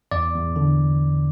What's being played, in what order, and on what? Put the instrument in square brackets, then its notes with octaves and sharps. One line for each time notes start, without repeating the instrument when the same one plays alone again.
[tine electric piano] E2 D5
E2
D3